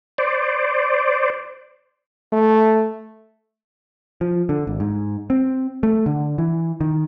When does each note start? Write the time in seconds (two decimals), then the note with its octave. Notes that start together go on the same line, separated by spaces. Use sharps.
0.18 C5 D5
2.33 A3
4.21 F3
4.49 D3
4.67 G#1
4.80 G#2
5.30 C4
5.83 A3
6.06 D3
6.38 E3
6.81 D#3